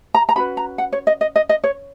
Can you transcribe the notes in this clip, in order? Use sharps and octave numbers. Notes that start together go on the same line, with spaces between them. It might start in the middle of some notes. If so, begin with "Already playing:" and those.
A#5
A#5
C#4 F#4 B4 B5
A#5
F#5
C#5
D#5
D#5
D#5
D#5
C#5